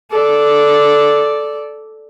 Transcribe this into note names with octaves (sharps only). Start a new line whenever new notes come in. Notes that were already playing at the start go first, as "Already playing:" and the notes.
A4 D5